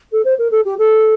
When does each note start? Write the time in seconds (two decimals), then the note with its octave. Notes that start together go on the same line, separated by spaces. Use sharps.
0.12 A4
0.24 C5
0.38 A#4
0.51 A4
0.65 G4
0.78 A4